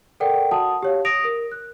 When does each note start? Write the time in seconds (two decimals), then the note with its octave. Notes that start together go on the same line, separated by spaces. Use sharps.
0.20 A4 A#4 D5 F#5 G5
0.51 F#4 F#5 A5 D#6
0.83 G4 C#5 F5
1.05 D#6 A#6 D7 F7
1.24 A#4
1.52 F#6